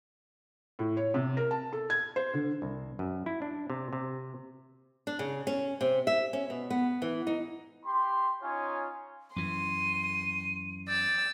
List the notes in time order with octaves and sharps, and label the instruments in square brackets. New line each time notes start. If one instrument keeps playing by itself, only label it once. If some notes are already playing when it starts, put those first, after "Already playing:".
[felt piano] A2
C#5
C3
A#4
A5
A4
G#6
C5
D3
[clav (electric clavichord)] C2
F#2
E4
D4
C3
C3
[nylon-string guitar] D4
C#3
C#4
C3
E5
C#4
B2
B3
E3
D#4
[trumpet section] G4 B5 C6
C#4 D#4 F4 C#5 G#5
[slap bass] F#2 E3 [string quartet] C6 [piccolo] D#7
[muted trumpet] D5 [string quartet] E6 [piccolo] G6